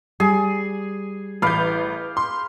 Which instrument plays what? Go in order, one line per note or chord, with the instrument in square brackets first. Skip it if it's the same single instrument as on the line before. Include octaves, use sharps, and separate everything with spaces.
[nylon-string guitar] G3 [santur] G#4
[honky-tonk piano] A1 G6 [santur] B4 F5 D6
[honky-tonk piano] C6